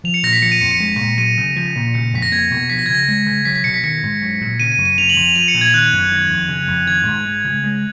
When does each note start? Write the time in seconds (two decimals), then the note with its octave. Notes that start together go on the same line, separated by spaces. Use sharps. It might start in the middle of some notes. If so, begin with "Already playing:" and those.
0.04 F3 F7
0.14 C#7
0.23 A#2 A#6
0.33 B6
0.42 F3 C#7
0.52 D#7
0.61 F2 C#7
0.71 C#7
0.80 G#3
0.99 A#2
1.18 F#3 D#7
1.37 C#3
1.56 F3
1.76 A#2
1.94 C#3 C#7
2.13 F2 B6
2.22 A#6
2.32 A#3 G#6
2.51 B2
2.70 F3 B6
2.79 A#6
2.86 G#6
2.89 C#3
2.95 A#6
3.08 G#3
3.26 C#3
3.45 F#3 B6
3.55 B6
3.64 B2 C#7
3.74 B6
3.83 D#3 C#7
4.03 G#2
4.22 F#3
4.41 A#2
4.60 C#3 D#7
4.72 D#7
4.78 F#2
4.85 D#7
4.98 C#3 F7
5.10 F#7
5.16 F2
5.23 F7
5.36 F3 D#7
5.48 C#7
5.54 A#2
5.61 G#6
5.73 D#3 F#6
5.93 F#2
6.11 D#3
6.30 F2
6.49 C#3
6.68 F2
6.87 D#3 G#6
7.06 G#2
7.25 G#3
7.45 C#3
7.64 G#3